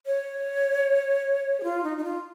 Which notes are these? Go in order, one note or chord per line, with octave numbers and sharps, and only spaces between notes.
C#5
G#4
F4
D#4
D#4
F4